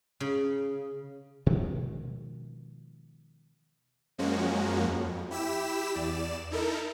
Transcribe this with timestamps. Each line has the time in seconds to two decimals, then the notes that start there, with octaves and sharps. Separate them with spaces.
0.20 C#3
1.46 B2 D#3 F3 G#3
4.18 F#2 F3 G#3 A#3 C#4 F#4
4.86 F2
5.31 E4 G4 E6 B6 E7
5.93 E2 D5 E7
6.51 D#4 E4 A4 A#4